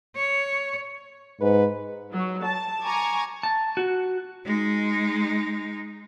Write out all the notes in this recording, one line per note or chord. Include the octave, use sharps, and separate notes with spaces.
C#5
G#2 B4
F#3
A5
G#5 A#5 C#6 D6 G#6
A5
F#4
G#3 D#4